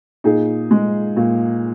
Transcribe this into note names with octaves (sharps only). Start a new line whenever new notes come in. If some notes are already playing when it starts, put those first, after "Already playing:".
A#2 D#4 G#4
G#3
A#2